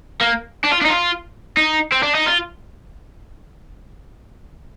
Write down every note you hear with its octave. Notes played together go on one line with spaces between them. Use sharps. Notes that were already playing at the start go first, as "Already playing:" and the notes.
A#3
D4
F4
D4
D#4
F4
D#4
C4
D4
D#4
F4